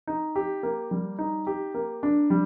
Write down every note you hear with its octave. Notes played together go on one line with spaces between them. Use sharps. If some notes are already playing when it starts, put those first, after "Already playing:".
D#4
G4
A#3
G3
D#4
G4
A#3
D4
G3